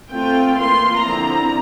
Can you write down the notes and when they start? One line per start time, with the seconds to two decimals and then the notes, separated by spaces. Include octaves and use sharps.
0.13 A3 C4 F4 G5
0.58 E3 A#3 F4 C6
1.04 D3 F3 C4 E4 A#5